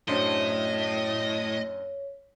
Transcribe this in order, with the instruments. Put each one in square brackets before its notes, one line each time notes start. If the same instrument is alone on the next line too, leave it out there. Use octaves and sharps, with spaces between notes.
[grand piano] F#2 D4 C5 [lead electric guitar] A2 [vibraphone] C#5 [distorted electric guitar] D#5